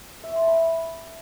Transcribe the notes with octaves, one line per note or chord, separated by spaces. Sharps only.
E5
C#6
C6
A5
B5